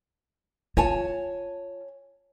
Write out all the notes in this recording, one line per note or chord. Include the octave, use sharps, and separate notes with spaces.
F4 C#5 G#5 A5